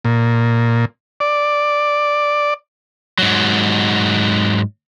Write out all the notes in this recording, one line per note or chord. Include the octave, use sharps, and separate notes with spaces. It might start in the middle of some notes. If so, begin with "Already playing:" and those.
A#2
D5
G#2 F#3